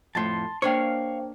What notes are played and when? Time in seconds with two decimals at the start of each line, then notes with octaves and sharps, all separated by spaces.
0.15 F2 A2 A5 C6
0.62 A#3 D4 C5 C#5 F5 G5 C#6